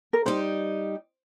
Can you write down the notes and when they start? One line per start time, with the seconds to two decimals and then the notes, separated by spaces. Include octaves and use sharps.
0.13 A#4
0.26 G3 D#4 G4 C5